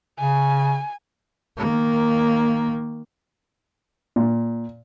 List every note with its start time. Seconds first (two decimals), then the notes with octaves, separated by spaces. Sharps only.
0.20 C#3 G#5
1.57 D#3 A#3
4.16 A#2